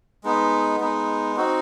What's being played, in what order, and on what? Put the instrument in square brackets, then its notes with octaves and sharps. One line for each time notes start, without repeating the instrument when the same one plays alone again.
[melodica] G#3 B3 D#4
G#3 B3 D#4
C4 D#4 F#4